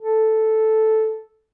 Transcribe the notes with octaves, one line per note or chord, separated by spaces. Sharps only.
A4